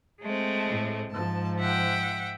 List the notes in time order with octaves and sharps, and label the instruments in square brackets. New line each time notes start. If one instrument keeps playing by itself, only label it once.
[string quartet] G#3 A3 C4
[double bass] A2
[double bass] G#2 F3 [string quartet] A5
[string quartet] E5 F#5 G5